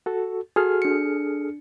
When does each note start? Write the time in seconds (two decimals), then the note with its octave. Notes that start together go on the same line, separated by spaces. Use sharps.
0.06 F#4 A4
0.56 F#4 G#4 A4 F6
0.82 D4 C#7